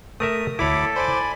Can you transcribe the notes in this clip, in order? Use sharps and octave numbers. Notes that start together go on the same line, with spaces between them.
A3 A#4 E5 D#6
D2 E4 A4 C#5 B5 D6
C5 D5 G#5 B5 D6